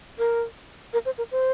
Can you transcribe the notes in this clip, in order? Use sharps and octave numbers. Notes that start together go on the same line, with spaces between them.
A#4
A#4
C5
A#4
C5